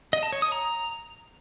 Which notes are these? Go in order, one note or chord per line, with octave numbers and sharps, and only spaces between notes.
D#5
A5
C#5
D#6
A#5